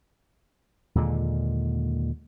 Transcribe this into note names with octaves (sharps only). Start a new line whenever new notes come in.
D#2 A#2 D3 G#3